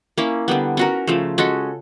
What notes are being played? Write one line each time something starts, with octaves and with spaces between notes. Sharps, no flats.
A#3 C#4 E4
D3 G3 B3
C#4 F#4 A#4
C#3 F3 A3
G#3 C#4 F#4 A4